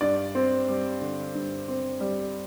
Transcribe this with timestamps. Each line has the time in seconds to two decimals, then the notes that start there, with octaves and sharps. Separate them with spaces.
0.01 G2 D5
0.35 C4
0.68 G3
1.01 D3
1.35 G2
1.68 C4
2.00 G3